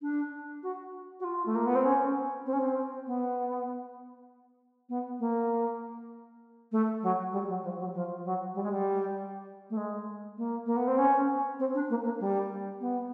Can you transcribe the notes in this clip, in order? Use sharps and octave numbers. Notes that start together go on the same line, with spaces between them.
D4
F#4
F#4
F4
A3
A#3
B3
C4
C#4
C4
C#4
C4
B3
B3
A#3
A3
F#3
G3
F#3
F3
F#3
F3
F#3
G3
G#3
G3
A3
G#3
A#3
A#3
B3
C4
C#4
C4
D4
A#3
A#3
G3
B3